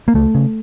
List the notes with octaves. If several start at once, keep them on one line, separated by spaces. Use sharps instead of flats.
A#3
C#2 A3
C#3